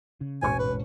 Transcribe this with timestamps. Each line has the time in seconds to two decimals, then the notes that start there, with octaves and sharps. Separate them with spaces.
0.21 C#3
0.42 E1 A1 G#2 C#4 G#5 C#6
0.59 B4